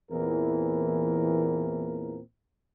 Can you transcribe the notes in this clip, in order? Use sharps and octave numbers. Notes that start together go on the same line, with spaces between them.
E2 A#2 E3 A#3 C4 A#4